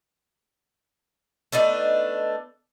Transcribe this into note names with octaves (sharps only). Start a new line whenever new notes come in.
A3 B3 D4 D#4